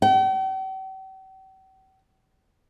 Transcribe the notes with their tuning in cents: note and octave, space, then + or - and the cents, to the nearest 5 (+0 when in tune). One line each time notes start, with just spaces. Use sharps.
G5 -45